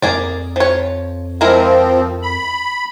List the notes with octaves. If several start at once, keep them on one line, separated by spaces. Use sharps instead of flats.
F2 A#3 G#4 D5
F3 C#5
F3 G#3 C4 E4 A#4
B5